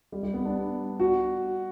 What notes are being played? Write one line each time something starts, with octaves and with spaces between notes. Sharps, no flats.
G3
G3
B3
D4
F#4